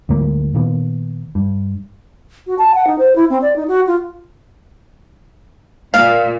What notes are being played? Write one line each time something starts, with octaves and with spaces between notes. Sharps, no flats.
D2 G#2 F#3 A#3
A#2 D#3 A#3 B3
G2
F#4
A5
F#5
D#4
C5
E4
C4
D5
D#4
F#4
F4
A#2 F5